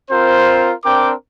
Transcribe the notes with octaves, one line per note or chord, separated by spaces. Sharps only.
C4 F4 A#4 C5
C4 D4 A#4 G5 D6